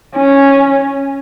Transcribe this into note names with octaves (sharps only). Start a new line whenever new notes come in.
C#4